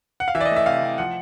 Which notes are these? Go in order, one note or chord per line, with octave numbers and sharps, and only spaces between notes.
F#5
F5
E3 E5
D5
D#5
A3 E5
C3 F5
C3
F3 F#5